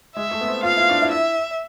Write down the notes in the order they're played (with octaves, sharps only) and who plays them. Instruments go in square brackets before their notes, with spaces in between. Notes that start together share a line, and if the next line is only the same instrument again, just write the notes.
[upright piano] G#3 [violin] E5
[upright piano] A3
B3
C4
[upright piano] F4 [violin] F5
[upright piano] E4
D4
E4
[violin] E5